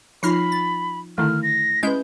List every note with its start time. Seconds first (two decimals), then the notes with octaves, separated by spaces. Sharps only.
0.23 F3 D#4 F4 B5 F6 A#6 C7
0.52 A6
1.18 D3 D#3 A3 E4 F6
1.43 A#6
1.83 G#3 C#4 E4 B4 G6